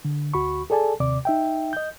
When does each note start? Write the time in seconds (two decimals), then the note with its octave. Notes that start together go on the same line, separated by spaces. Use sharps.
0.05 D3
0.34 D2 F#4 B5 C#6
0.70 G#4 A4 D5 G#5 A5
1.00 D#2 C3 D5 D6
1.25 D#4 E5 G5
1.73 D#5 G6